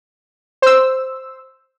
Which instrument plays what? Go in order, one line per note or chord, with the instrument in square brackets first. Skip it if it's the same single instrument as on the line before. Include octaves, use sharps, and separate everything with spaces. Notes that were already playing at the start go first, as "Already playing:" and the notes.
[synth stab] C5 E6